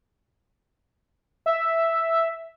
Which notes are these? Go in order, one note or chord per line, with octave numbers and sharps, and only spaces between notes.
E5